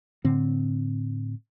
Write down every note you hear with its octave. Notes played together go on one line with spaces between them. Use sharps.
A2 D3 C4